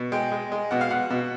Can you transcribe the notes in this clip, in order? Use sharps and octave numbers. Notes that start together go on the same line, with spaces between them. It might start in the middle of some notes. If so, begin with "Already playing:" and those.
Already playing: B2
G#3 G5
G#3
G#3
B2 F#5
F5
B2 F#5
B2